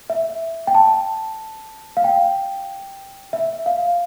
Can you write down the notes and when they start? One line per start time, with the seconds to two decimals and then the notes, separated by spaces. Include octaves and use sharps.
0.10 E5
0.67 G5
0.75 A5
1.97 F5
2.04 G5
3.33 E5
3.66 F5